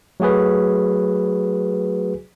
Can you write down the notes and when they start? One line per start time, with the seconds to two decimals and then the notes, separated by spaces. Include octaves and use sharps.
0.20 F#3 A3 F#4 G#4 B4